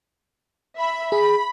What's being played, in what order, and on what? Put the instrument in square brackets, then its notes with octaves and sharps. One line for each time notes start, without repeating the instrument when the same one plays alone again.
[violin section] E5 B5
[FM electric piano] G#4 [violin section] B5